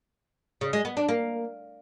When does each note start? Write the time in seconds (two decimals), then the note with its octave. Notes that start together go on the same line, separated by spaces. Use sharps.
0.61 C#3
0.73 G#3
0.85 B3
0.97 D4
1.09 A#3